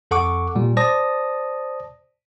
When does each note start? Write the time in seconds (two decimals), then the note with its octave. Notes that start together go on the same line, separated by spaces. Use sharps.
0.11 F2 A4 F#5 C#6 D6
0.56 A#2 G3
0.77 C5 D5 A5 D#6 A#6